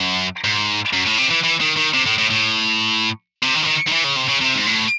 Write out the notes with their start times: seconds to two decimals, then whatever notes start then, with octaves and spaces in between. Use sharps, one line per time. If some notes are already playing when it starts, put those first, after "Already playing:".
Already playing: F#2
0.44 G#2
0.93 F#2
1.06 A2
1.18 C3
1.30 E3
1.43 E3
1.60 D#3
1.76 D#3
1.94 C3
2.06 A2
2.18 A2
2.30 A2
3.42 C3
3.55 D#3
3.62 E3
3.66 D#3
3.87 D#3
3.92 E3
4.04 C#3
4.16 C3
4.28 C#3
4.41 C3
4.55 G#2
4.66 A2